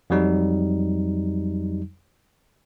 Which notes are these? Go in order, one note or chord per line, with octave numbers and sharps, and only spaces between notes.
F2 F#3 G3 D#4